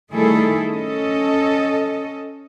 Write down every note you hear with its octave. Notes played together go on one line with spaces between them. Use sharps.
D#3 G3 A3 E4 G#4 A4
C#4 A4 D#5